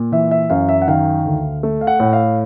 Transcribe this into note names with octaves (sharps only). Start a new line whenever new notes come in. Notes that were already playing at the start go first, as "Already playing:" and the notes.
Already playing: A#2
E3 E5
E5
F#2 F5
E5
F#5
D#3 F5
D2
A3
F5
F#5
A2
F5